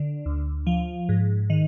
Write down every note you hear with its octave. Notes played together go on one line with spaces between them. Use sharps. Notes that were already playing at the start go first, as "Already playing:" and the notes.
Already playing: D3
D2
F3
G#2
D#3